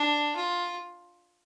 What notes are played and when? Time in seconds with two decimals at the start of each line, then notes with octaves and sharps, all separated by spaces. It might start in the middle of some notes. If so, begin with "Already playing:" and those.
Already playing: D4
0.36 F4